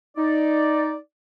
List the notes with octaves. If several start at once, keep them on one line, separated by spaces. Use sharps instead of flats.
D#4 D5